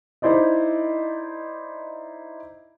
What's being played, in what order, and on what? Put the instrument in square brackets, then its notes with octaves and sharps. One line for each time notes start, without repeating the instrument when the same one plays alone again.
[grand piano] D#4 E4 C5 D5 D#5